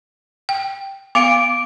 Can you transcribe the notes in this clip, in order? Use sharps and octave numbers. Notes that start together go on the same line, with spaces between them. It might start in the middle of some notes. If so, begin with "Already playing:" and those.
G5
B3 F5 D6 D7